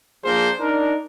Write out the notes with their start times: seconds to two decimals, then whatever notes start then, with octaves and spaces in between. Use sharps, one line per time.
0.24 F3 A#3 D4 G#4 A#4 C5
0.60 D4 D#4 A#4